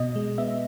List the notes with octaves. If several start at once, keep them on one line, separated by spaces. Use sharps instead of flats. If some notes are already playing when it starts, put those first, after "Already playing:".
Already playing: B2 D#5
G#3
B3 E5